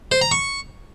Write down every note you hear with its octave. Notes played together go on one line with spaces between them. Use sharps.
C5
A#5
C#6